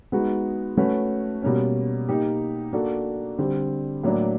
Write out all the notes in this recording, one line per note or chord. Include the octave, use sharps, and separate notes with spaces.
G#3 B3 D#4 F#4
A3 C#4 F#4 B4
B2 G3 A#3 C#4
A#3 D#4 G4
A#3 D4 F#4 A4
D3 G3 C4
A2 F#3 A#3 D4